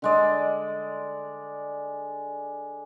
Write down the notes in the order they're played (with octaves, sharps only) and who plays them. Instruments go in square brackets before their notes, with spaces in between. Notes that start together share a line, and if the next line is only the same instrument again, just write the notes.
[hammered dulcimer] D3 G#3 D5